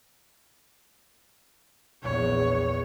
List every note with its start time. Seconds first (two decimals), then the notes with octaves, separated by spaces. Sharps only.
2.03 A#1 E2 C#5